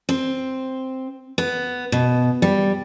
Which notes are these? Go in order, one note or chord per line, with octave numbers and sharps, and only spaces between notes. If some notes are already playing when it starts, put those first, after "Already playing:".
C4
B3
B2
G3